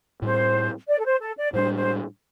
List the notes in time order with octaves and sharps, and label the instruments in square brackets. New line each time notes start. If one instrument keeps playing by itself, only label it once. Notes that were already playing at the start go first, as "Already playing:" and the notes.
[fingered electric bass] A2 G3 C4 [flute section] C5
[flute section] D5
A4
C5
A4
D5
[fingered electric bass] A2 G3 D4 [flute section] C5
[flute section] C5